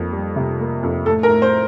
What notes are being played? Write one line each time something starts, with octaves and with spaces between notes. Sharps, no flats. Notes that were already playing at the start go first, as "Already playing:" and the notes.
Already playing: F2 A#3
G3
C3
A#3
F2
A2 A4
A#4
A2
C5